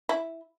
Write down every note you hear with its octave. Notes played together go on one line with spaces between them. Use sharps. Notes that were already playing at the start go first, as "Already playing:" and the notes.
E4